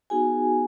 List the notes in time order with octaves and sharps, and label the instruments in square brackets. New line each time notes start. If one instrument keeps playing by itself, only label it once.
[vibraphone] B3 D#4 F#4 G#4 G#5